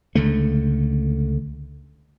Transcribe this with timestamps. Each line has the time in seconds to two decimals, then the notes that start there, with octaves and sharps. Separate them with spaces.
0.15 C#2 D3 A3